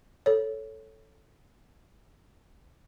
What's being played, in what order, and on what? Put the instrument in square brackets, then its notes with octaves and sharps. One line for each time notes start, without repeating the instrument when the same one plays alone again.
[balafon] A4 C#5